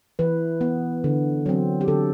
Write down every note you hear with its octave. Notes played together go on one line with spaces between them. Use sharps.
E3 B4
B3
D3
F#3 C4
G4
D3 A4